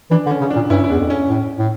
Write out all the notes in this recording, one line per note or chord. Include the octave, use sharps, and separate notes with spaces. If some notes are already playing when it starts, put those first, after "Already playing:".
E3 D4
D3
C#4
C#3
D4
A#2
G2 C#4 E4
E4
E2 D4
F2
C#4
A2
A2